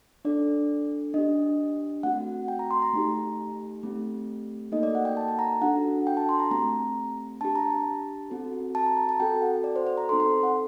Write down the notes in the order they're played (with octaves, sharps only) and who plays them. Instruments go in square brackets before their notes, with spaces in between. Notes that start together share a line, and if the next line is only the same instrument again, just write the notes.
[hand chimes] D4 A4 D5
D4 G4 D#5
A3 C4 F#4 F#5
G5
A#5
C6
A#5
A3 D#4 G4
A3 C4 G4
A#3 D#4 F#4 A4 D#5
D5
F#5
G5
A5
A5
A#5
D4 F#4 A4 F#5
G5
A5
C6
A#5
A3 C4 G4 A#5
D4 G4 A5
A#5
A5
C4 F#4 A4
A5
A#5
A#5
A5
C4 F#4 A4 G5
F#5
D5
C5
C5
A#5
C4 D#4 A4 C6
C6
F#5